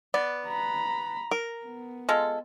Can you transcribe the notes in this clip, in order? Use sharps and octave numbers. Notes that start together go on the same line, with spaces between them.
B3 D5
A#5 B5
A#4
B3
G#3 F4 A4